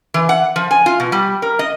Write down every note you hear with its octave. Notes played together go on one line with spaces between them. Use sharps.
E3
F#5
F3
G#5
F4
B2
G3
A#4
D#5